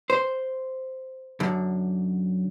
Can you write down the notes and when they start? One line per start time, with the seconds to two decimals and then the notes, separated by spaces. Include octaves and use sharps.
0.10 C5
1.40 F#2 D3